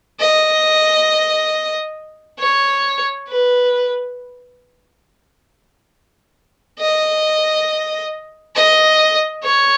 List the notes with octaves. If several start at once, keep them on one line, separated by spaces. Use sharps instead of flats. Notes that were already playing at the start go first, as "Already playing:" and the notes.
D#5
C#5
B4
D#5
D#5
C#5